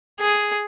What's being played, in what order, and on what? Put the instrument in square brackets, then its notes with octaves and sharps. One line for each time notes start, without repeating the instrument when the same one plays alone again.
[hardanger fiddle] G#4